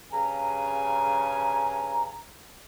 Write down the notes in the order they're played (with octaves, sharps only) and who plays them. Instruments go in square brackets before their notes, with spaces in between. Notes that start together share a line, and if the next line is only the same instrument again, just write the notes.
[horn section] G2 C#3 G#5 [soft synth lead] A#5